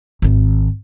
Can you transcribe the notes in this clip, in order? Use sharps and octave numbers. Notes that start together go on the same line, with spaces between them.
G#1 D#3